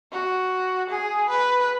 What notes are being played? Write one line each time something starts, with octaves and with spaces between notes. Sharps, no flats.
F#4
G#4
B4